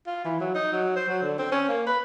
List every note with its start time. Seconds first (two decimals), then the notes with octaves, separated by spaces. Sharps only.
0.07 F4
0.25 E3
0.41 F#3
0.55 D#4
0.73 F#3
0.97 C5
1.09 F#3
1.23 D3
1.39 C4
1.52 C#4
1.69 A#3
1.87 B4